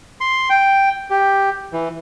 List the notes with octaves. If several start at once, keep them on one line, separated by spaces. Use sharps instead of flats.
C6
G5
G4
E3